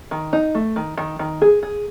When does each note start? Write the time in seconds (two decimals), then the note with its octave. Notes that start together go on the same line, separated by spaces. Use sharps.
0.11 D#3
0.33 D#4
0.55 A3
0.76 D#3
0.98 D#3
1.19 D#3
1.42 G#4
1.63 G#4